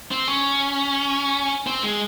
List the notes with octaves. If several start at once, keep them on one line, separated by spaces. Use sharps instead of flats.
C4
C#4
C4
G#3